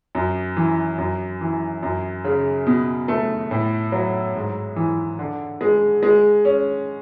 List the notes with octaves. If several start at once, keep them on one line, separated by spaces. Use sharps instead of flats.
F#2
E3
F#2
E3
F#2
C#3
B2
A3
A2
F#3
G#2
E3
D3
G#3
G#3
C#4